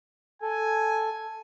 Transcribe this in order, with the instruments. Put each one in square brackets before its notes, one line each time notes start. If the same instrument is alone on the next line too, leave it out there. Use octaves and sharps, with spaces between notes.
[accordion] A4 [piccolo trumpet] G#5